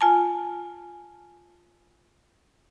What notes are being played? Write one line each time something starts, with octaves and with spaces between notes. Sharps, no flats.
F4 G#5 A5